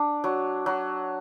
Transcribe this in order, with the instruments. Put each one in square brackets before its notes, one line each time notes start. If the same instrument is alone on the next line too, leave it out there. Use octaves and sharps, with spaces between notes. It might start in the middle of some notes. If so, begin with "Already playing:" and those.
Already playing: [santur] D4
F#3
F#3